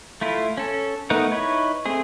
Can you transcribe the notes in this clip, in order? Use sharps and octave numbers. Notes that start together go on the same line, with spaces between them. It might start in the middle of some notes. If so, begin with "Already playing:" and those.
A3 E4 F4
C#4 A4
A3 B3 D#4 A#4 F#5
D#4 E4 B4 C#5
A3 C4 G#4